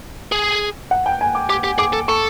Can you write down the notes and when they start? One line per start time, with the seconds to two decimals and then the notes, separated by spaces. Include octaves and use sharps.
0.32 G#4
0.91 F#5
1.06 G5
1.21 G#5
1.35 D6
1.50 G4 D6
1.64 G4
1.78 G#4 D6
1.93 A4
2.08 A4 C#6